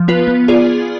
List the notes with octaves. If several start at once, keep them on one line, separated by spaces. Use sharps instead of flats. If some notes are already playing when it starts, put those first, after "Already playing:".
Already playing: F3
B3 F4 B4
B3
F4 G#4 D5